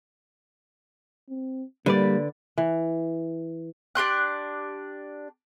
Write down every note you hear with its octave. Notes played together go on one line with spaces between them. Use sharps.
C4
D3 G3 A#3 B4 D5
E3
D4 G4 C6 F#6